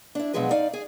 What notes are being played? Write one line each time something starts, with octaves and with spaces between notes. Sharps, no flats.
D4 E4
B2 F3 F#3 G#3 G#4 B4
D#4 D5 F5
G#4 G#5